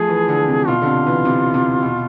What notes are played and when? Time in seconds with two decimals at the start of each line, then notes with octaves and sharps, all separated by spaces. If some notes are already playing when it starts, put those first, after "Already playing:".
Already playing: F3 A3 G#4
0.09 E3
0.28 D3
0.48 C3
0.67 B2 F4
0.82 D3
0.86 C3
1.06 E3
1.25 C3
1.54 C3
1.82 B2